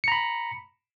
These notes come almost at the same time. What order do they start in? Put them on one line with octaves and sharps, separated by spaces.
C#7 A#5 B5